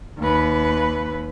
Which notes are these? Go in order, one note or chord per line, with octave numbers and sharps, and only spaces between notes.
D#2 B4